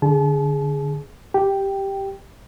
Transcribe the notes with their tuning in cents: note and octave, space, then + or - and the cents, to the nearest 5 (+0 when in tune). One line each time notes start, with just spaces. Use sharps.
D3 +0 G#4 +0 A5 -35
G4 +0 G5 +0